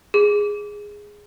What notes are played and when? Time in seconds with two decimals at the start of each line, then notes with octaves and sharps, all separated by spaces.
0.14 G#4